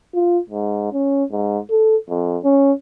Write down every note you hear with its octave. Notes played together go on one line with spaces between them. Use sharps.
F4
G#2
C#4
G#2
A4
F2
C#4